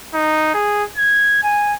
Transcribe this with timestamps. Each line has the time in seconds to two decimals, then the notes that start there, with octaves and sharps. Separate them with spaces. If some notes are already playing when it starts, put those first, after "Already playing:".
0.15 D#4
0.54 G#4
0.97 G#6
1.43 G#5